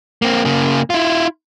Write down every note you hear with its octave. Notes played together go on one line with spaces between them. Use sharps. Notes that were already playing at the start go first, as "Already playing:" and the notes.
A#3 C4
C#3 A#3
E4 F4